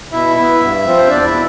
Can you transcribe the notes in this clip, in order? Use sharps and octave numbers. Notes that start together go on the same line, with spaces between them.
B2 E4 E5
B3 E4
G2
F3 C4 F4
C5
E2 D4 D5
E4 E5
B2